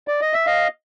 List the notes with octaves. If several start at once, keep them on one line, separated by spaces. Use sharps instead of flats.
D5
D#5
E5
D#5 F5